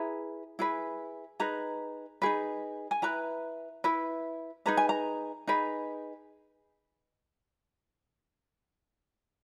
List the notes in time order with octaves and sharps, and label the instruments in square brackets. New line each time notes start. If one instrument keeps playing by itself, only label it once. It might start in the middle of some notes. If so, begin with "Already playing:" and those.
Already playing: [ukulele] E4 G#4 B4 A#5
E4 G#4 B4
D#4 G#4 B4 A#5
D#4 G#4 B4
G#5
E4 B4 A#5
E4 B4
D#4 G#4 B4 A#5
G#5
A#5
D#4 G#4 B4